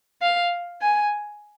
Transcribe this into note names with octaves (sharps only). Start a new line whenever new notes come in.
F5
G#5